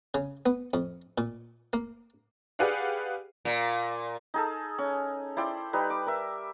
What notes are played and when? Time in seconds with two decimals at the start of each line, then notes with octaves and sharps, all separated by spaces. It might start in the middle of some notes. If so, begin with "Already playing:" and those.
0.14 C#3
0.46 B3
0.74 F2
1.18 A#2
1.73 A#3
2.59 G4 G#4 B4 D5 F5 F#5
3.45 A#2
4.34 D#4 G#4 A4
4.78 C#4
5.37 E4 C5 D5 G5
5.73 G3 D#4 B4
5.90 D6
6.07 A#4 E5